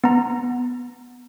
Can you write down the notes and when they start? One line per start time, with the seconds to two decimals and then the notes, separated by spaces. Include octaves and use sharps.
0.04 B3 A#5